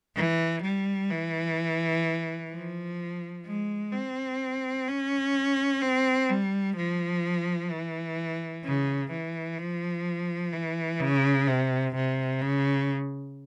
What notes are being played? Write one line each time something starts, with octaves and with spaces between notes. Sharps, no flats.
E3
G3
E3
F3
G#3
C4
C#4
C4
G3
F3
E3
C#3
E3
F3
E3
C#3
C3
C3
C#3